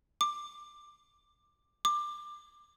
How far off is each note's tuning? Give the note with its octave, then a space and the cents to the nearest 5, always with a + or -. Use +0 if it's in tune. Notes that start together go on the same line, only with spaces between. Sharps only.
D6 +10
D6 +20